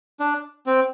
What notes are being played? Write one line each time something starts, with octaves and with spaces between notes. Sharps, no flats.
D4
C4